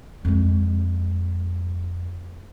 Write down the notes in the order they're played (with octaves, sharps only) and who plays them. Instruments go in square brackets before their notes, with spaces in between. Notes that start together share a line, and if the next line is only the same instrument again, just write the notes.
[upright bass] F2 G#3